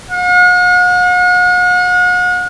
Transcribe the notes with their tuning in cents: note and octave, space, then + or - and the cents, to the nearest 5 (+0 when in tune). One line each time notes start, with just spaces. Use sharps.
F#5 -45